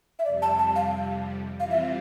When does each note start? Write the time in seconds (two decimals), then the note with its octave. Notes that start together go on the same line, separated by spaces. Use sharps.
0.19 E5
0.25 F2 C3 G3 D5
0.42 A5
0.59 A5
0.75 F5
1.60 C3 E3 G3 C4 F4 F5
1.71 E5